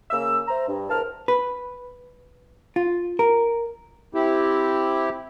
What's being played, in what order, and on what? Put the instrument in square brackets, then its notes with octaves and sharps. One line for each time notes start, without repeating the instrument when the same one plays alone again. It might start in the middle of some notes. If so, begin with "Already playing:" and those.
[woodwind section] C#3 A#3 E6
C5 E5 A#5
G2
E2 A#4 C5 A5 F6
[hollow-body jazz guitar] B4
F4
A#4
[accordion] C4 E4 G4